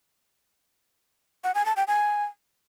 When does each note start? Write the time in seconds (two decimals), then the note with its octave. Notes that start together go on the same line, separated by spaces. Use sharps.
1.44 F#5
1.55 G#5
1.66 A5
1.77 G5
1.88 G#5